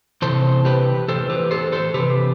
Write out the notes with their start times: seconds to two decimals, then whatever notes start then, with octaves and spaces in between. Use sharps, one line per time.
0.22 C3 E3 A4 C5
0.65 G4 B4
1.08 A2 E3 A4 C5
1.30 G4 B4
1.51 A4 C5
1.72 A4 C5
1.94 C3 E3 G4 B4